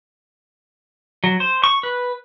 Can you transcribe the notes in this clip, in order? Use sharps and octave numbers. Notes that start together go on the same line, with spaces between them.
F#3
C5
C#6
B4